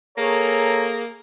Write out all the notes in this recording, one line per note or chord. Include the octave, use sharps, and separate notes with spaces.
A#3 G#4 A4 C#5 A#5